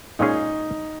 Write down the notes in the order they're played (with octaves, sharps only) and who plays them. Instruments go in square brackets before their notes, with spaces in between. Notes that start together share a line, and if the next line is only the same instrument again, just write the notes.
[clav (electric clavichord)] A#2 G#3 C#4 G#4 [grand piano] D#4